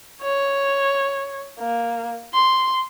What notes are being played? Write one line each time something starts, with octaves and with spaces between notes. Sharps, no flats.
C#5
A#3
C6